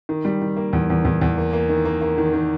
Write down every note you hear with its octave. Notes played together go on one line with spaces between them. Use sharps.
D#3
G3
D#3
A#3
E2
E2
E2
E2
A#3
A#3
D#3
A#3
A#3
D#3
D#3